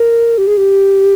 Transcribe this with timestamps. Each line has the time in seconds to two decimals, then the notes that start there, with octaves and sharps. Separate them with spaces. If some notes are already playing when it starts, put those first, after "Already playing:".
Already playing: A#4
0.38 G4
0.47 G#4
0.57 G4